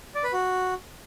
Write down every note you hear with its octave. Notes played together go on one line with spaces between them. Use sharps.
D5
B4
F#4